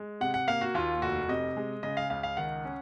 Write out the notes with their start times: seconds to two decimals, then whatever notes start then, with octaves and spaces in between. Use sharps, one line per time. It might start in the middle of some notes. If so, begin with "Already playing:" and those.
Already playing: G#3
0.20 C3 F#5
0.34 F#5
0.48 A#3 F5
0.61 F#4
0.74 D#2 F4
1.02 F1 F#4
1.28 C3 D#5
1.57 G#3
1.83 C#3 D#5
1.97 F5
2.10 C#2 F5
2.23 F5
2.37 D#3 F#5
2.65 C#4